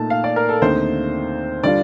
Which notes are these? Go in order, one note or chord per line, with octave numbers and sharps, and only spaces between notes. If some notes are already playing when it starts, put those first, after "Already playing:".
Already playing: A#2 A3 D#4 A5
F5
D5
A#4
A4
D#2 D3 A3 C4 D#4 C5
D3 G3 D4 F4 D5